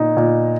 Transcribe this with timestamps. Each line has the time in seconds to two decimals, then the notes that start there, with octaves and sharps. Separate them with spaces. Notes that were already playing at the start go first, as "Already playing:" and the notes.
Already playing: A#2 D#4
0.17 A#2